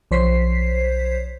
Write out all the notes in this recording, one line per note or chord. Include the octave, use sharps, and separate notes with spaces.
B1 F3 C5 C#5 B6 C7